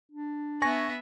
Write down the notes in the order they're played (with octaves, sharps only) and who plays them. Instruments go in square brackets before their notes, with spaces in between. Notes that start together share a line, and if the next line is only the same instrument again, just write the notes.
[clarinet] D4
[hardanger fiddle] B3 E5 [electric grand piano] G#5 C#6 A#6